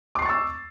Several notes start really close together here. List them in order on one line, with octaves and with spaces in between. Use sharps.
D6 C7 C#6 A6 E6